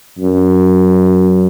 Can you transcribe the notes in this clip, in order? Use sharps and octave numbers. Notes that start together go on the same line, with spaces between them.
F#2